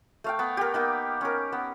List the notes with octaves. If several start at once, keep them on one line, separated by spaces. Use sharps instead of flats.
A3 F5 G5
B3
G4 A#4
A#3 B3 D#4
C#4 A#4
B3